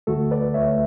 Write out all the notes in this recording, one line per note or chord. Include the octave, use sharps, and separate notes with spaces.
D2 D3 A3 F#4 A4
B4 D5
D2 D3 A3 C#5 E5